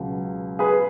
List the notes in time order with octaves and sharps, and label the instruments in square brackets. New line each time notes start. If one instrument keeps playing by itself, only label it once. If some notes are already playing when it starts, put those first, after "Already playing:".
Already playing: [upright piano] C#2 B2 F#3
G#4 B4